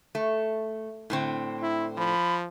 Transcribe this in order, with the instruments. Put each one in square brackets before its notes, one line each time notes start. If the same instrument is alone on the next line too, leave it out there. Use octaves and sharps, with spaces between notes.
[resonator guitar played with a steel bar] A3
A2 D3 C4
[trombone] E4
[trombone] F3 [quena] B5